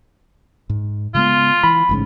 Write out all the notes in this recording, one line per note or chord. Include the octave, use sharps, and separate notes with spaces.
G#2
C#3 G#3 B3 F4
E3 B5
A1 G#2 C#3